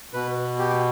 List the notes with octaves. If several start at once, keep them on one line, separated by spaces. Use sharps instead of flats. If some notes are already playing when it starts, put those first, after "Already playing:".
B2 B4
G4